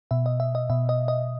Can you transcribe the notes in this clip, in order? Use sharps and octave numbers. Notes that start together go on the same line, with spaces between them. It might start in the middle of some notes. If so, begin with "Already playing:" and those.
B2 E5
D#5
E5
D#5
B2 E5
D#5
D#5